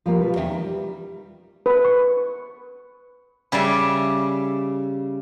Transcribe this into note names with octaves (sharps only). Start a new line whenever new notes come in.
F3 G3 A#3
B2 G3 F4 B4
E2 D#3 E3 C#4 E5 G5
D#4
G3
B4
C#6
C#3 G3 D5 E5